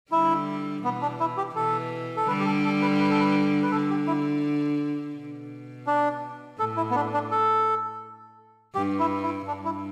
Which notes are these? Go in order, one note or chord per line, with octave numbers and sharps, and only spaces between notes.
D3 G3 E4
B2 E3 B3
D4
E4
G4
B2 E3 A4
A4
D3 G3 B4
G4
A4
A4
B4
B4
A4
B4
B4
D3 A4
G4
E4
B2
D4
A2 A4
E4
B3
D4
D4
A4
G2 G4
E4
E4
G2 D4
E4